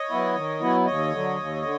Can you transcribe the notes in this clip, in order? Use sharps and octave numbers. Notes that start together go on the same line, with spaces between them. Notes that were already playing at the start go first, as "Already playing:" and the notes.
Already playing: C#5 D#5
F#3 B3 E4
D#3
F#3 B3 E4
D#2 C#5 D#5
D3 F#3
D#2
D3